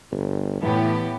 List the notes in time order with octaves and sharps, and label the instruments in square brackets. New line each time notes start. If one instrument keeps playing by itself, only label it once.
[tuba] G1
[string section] A2 B3 G4 [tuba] E3